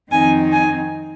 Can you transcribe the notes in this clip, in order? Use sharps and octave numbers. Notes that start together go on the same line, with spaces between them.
F2 D#3 C4 D#4 G#5
G#5